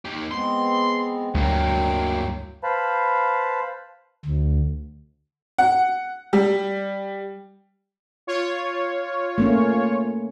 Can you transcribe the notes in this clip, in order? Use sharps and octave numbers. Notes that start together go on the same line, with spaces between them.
D#2 G4
G#3 B3 C4 C6
D2 G2 F#3 A#3 G5
B4 C5 F5 A5 B5
D2
F#5
G3
F4 C#5
A3 A#3 C#4